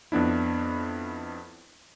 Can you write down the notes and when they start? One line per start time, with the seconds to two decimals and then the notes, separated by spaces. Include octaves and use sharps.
0.12 F2 B3 D4 E4